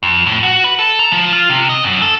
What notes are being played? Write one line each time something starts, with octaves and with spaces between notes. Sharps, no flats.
F2
A2
F#4
B4
A4
A#5
F3
F4
C3
D#5
F#2
A4